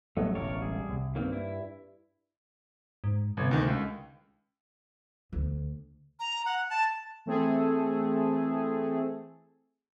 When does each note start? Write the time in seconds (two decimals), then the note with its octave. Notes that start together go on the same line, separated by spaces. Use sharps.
0.17 A1 F#3 G3 A3 B3
0.35 E1 A1 A#4 C#5 D5
0.61 G3 G#4
0.89 C2
1.15 G2 D#3 A#3 C4
1.33 E4
3.04 G#2
3.37 G1 C3
3.51 D2 D#3
3.67 C#2
5.33 D2
6.20 A#5
6.46 F#5
6.70 A5
7.26 E3 A3 C4 G#4 A4